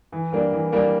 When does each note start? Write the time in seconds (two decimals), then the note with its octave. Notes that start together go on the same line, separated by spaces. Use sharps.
0.12 E3
0.32 G3 A#3 D4
0.52 E3
0.72 G3 A#3 D4